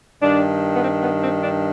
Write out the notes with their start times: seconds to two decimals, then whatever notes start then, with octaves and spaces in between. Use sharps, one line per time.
0.22 G2 D#3 D4
0.75 B3
0.83 C4
1.03 B3
1.23 C4
1.44 D4